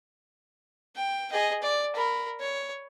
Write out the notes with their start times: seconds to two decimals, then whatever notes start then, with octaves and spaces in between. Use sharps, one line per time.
0.96 G5
1.32 G#4 D#5
1.62 D5
1.95 A#4 B5
2.40 C#5